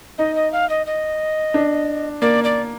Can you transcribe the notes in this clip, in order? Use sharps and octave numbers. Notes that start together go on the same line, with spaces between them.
D#4 D#5
D#5
F5
D#5
D#5
D4
A#3 D5
D5